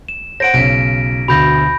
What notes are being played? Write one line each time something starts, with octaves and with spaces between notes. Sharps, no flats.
E7
C5 F#5 A#6 D7
B1 C#3 B6 D7
D2 B2 B5 G6 A#6